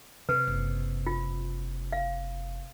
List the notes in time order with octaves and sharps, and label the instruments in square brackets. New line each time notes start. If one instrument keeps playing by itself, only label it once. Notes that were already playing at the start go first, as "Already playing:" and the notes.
[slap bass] C3 [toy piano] B4
[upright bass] F#1
[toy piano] F4
F5